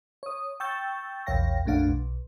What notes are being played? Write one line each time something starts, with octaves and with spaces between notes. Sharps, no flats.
C#5 D#6
G5 C#6 E6 G6 A6
A#1 E2 C#5 F5 G5 A#6
A#1 F2 A3 D4 F5 F#5
B1